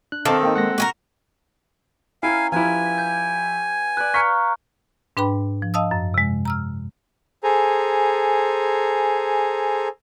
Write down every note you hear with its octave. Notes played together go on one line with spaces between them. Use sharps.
D4 F#6
D#3 C4 A4 F5 A5 D6
A#3 D#4 F5 G5
G#3 A#3 F#5 F#6 A#6
F#4 G#4 A#4
C#4 E4 A#4 F5 G5 G#5
F3 E4 G4 B4 F5 G#5
G6 G#6
B4 D5 F#6
F5 A#5 C#6 F6 F#6 B6 C#7
G#2 D4 B4 G5 B5
F3
D#5 F5 A5 D#6 E6
F#2
C3 G#3
A#5 E6 F6
G#4 A4 C5 G#5 A#5